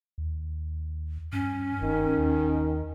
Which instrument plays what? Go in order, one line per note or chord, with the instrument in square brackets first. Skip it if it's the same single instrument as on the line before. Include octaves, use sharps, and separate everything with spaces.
[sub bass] D#2
[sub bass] G2 [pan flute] C#4
[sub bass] F#1 [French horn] D#3
[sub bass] D#2